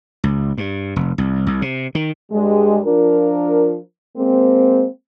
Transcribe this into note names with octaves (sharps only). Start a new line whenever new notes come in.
C#2
G2
F1
C2
C2
C3
D#3
G2 G3 G#3
F3 D4 F4 A#4
G#3 A#3 C4